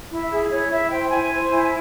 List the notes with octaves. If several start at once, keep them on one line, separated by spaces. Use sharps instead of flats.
E4
E5
G#4
E4 C#5
E4 E5
C5 G5
E4 G#5
C5
E4